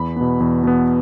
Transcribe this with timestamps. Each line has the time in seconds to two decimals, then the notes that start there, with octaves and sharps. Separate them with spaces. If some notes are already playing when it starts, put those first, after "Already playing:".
Already playing: E2 B5
0.16 B2 B3
0.40 E2
0.63 B2 B3